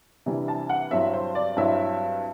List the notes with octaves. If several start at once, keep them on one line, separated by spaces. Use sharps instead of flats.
C3 E3 G3 D4
A5
F#5
G2 F#3 C4 E4 E5
C5
D5
G2 F#3 C4 E4 E5